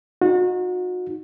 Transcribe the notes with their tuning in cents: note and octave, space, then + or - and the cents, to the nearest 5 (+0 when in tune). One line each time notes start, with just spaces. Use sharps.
D#4 +0 F#4 -35